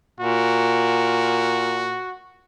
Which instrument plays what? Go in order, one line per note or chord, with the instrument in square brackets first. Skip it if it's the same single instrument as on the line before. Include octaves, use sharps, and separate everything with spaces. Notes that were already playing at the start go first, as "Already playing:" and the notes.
[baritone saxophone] A#2 [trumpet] F#4